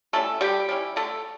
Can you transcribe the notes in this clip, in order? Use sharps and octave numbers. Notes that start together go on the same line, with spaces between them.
G3 A3 C#4 E4 A4
D3 G3 G4
G3 C#4 E4
D3 A3 A4